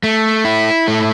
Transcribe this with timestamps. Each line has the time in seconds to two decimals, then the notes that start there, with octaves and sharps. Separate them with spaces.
0.03 A3
0.45 E4
0.88 A3